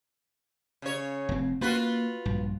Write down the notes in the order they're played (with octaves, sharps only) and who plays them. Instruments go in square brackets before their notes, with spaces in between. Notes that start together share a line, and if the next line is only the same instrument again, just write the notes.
[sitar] C#3 C#5
[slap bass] F1 C4
[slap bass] A#3 [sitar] F4 F#4 B4
[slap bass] A#1 G2